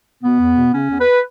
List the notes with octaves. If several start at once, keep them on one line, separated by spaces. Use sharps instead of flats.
B2 B3
E2
B2
C#3 C#4
E2
B4